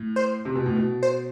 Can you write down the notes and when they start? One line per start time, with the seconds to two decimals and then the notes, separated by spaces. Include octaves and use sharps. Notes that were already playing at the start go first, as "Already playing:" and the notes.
Already playing: A2
0.16 C5
0.45 C3
0.56 B2
0.66 A2
0.76 B2
1.03 C5